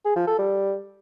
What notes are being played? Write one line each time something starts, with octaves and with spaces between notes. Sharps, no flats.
G#4
F3
A4
G3